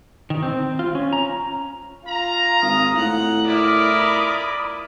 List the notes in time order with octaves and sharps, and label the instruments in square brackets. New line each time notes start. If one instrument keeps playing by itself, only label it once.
[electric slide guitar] D#3
C4
F4
C#4
A#5
[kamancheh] F4 F5 [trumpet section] A#5
[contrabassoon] G#1 [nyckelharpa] D#6
[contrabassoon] A2 [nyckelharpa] F#5
[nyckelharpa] E4 D5 [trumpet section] F4 A#4 [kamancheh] B5 D#6